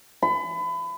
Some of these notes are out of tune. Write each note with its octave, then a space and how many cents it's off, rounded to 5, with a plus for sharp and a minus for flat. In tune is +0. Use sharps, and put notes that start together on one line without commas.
B5 +30